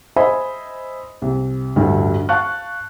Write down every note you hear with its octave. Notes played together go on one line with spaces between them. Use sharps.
C5 D#5 E5 G#5 B5
C2
A1 D2 G2 D3 G3
F5 A5 C#6 F#6